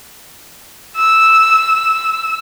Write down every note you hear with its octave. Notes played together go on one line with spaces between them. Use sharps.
E6